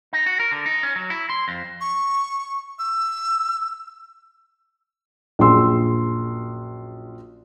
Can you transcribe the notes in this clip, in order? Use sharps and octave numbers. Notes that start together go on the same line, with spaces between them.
D#4
F#4
A#4
D3
D#4
C#4
F#3
E4
C6
F2
C#6
E6
A#1 F#2 G#4 C6 E6